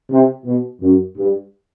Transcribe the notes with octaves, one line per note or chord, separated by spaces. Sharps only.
C3
B2
F#2
G2